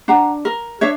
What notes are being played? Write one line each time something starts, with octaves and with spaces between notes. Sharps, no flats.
D4 F#5 A#5
A#4
D4 C#5 E5